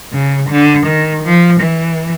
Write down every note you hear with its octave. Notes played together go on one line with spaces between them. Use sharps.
C#3
D3
D#3
F3
E3